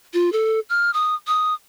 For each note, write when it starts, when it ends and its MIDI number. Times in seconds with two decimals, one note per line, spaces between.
0.14 0.32 65
0.33 0.60 69
0.70 0.93 89
0.94 1.15 87
1.28 1.54 87